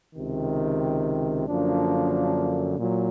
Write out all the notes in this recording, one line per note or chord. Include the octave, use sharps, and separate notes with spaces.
C#2 C3 D#3
F#2 D3 F3 A#3 D4
A#2 F#3